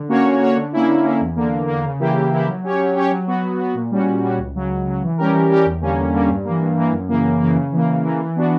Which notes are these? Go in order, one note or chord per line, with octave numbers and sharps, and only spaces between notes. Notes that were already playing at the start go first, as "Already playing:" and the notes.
Already playing: D3
A#3 C#4 F#4 C#5
D3
A#3 C#4 F#4 C#5
D3
A#3 C#4 E4
D3
A#3 C#4 E4
E2
D3 A#3
E2
D3 A#3
C#3
E3 A#3 E4 G4
C#3
E3 A#3 E4 G4
F#3
C#4 G4 C#5
F#3
C#4 G4 C#5
F#3
B3 F#4
F#3
B3 F#4
A#2
G3 C#4 F#4
A#2
G3 C#4 F#4
C#2
C#3 F#3
C#2
C#3 F#3
E3
G3 C#4 G4 A#4
E3
G3 C#4 G4 A#4
E2
D3 G3 A#3 C#4
E2
D3 G3 A#3 C#4
G2
E3 A#3
G2
E3 A#3
F#2
C#3 E3 A#3
F#2
C#3 E3 A#3
C#3
E3 A#3
C#3
E3 A#3
E3
B3 D4 F#4